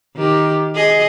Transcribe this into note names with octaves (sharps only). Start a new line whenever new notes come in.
D#3 G4
G#4 D#5